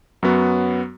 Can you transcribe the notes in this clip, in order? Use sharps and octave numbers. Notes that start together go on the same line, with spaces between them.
F#2 F#3 B3 F#4